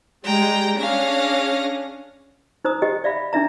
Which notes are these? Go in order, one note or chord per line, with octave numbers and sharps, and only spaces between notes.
G3 G#3 G5 A#5
C#4 D4 G#4 F5 A#6
D#4 C5 A#5 D#6
G4 D#5 G5
D5 E5 F5 B5
D4 D#4 E5 A#5